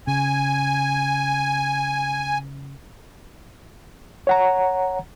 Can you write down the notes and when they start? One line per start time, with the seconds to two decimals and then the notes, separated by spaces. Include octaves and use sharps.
0.07 C#3 G#5
4.27 C#5 F#5 A#5